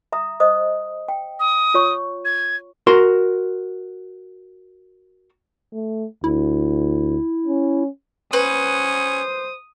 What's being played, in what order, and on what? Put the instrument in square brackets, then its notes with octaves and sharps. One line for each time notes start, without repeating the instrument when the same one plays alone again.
[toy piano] E5 A#5 D#6
C5 D#5 D#6
G5
[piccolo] D#6
[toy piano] F4 C#5 C#6
[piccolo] G#6
[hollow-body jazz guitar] F#4 A#4 C6
[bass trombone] A3
[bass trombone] D2 [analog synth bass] E4
[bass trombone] C#4
[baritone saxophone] C#4 [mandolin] B4 [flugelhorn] C5 [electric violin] D#6